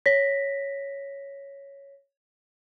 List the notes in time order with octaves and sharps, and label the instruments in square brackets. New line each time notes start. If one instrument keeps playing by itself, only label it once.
[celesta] C#5 A#6 B6